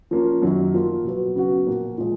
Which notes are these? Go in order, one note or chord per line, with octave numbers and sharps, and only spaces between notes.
F3 A#3 C#4 F4
F#2 D#3 F#3
F3 A#3 F4
B2 F#3 B3
C#3 F#3 B3 F#4
A#2 F3 A#3
A#2 F3 G#3